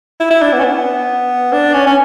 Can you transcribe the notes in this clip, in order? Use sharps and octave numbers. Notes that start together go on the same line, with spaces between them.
E4
E4
D4
B3
C#4
B3
D4
C#4
C#4